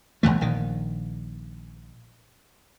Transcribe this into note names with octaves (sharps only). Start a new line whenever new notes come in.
B1 E2 E3 A3
A#1 D#3